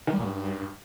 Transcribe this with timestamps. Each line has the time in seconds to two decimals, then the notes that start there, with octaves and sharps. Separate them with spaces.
0.07 D#3
0.13 G3
0.18 A#2
0.24 G2